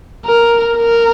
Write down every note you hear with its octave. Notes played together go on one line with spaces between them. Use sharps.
A#4
A#4